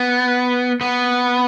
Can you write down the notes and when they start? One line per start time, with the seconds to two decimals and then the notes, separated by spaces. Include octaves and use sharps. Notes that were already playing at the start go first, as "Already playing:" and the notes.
Already playing: B3
0.81 B3